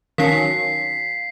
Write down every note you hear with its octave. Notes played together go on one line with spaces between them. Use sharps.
D#3 F#3 C#4 F5 A5 B6 C7